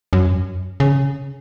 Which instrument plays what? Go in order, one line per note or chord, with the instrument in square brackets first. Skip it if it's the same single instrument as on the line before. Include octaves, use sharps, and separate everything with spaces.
[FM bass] F#2
C#3